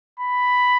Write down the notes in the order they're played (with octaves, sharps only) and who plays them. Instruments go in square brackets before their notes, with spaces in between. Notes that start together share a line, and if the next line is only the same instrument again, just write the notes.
[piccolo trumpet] B5